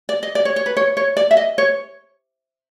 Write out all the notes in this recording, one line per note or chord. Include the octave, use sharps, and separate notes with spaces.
D5
D#5
D5
C#5
C#5
B4
C#5
C#5
D5
E5
D#5
C#5